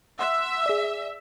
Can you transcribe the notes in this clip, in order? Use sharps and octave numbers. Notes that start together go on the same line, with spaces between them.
E5 F#5 C6 F#6
G#4 D5